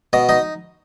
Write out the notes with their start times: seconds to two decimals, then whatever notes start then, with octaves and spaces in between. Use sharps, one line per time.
0.13 B2 D#5
0.29 D#4 D#5